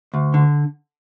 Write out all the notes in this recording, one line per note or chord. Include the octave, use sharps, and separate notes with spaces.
D2
D3